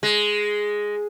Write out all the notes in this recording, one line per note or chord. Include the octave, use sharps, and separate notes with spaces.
G#3